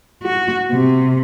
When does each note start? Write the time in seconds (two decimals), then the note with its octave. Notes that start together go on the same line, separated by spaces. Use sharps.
0.23 F#4
0.72 C3